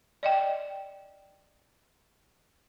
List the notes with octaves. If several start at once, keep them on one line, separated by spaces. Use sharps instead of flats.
D5 D#5 G5